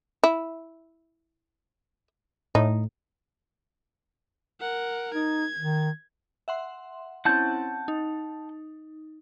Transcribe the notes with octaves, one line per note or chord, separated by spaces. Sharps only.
E4
A2 D#4
A#4 F#5
D#4 G#6
D#3
E5 F#5 C6
C4 C#4 E4 F#5 A5 G6
D#4